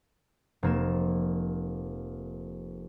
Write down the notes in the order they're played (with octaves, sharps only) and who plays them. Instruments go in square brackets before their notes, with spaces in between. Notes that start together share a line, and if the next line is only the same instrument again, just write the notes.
[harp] F1 A#3 E7